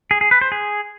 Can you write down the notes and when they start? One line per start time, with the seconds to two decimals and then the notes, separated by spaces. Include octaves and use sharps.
0.11 G#4
0.21 G#4
0.31 B4
0.41 C5
0.52 G#4